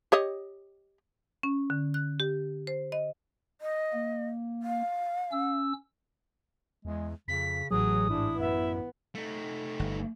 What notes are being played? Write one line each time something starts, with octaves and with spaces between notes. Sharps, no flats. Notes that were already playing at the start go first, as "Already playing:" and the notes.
G4 C#5 D#5
C#4
D3
F#6
G4
C5
D#5
D#5
A#3
F5
C#4 E6
E2 G#3
F2 C#3 B6
A1 F#3 G#4 D#6
G#2 D4 E4
F#2 B3 E5
A3 D#4
G1